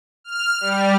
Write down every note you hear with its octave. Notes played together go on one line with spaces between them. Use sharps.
F6
G3